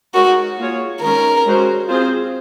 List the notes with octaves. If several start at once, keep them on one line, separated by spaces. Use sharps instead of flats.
G#3 D#4 F#4 A#4 C#5
A#3 F4 G#4 C#5
D#3 G#3 C#4 A#4
G#3 C#4 F#4 C5
C4 F4 G#4 C5